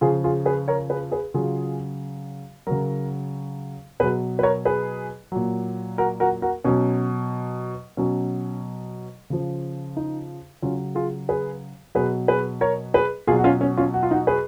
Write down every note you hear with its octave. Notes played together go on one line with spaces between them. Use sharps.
C#3 F3 F4 G#4
F4 G#4
G#4 B4
A#4 C#5
G#4 B4
G#4 B4
C#3 F#3 F4 G#4
C#3 F#3 F#4 A#4
B2 F#3 G#4 B4
B4
A#4 C#5
G#4 B4
A#2 F#3
F#4 A#4
F#4 A#4
F#4 A#4
B2 F#3 C#4
B2 F#3 C#4
C#3 F3
D#4
C#3 F#3 C#4 F4
F4 G#4
G#4 B4
B2 F#3 G#4 B4
G#4 B4
A#4 C#5
G#4 B4
B2 F#3 F4 G#4
F#4
C#4 F4
C#4
C#4 F4
F#4
F4
D#4 F#4
G#4 B4